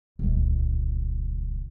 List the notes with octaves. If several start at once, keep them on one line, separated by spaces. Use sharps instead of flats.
D#1 C#2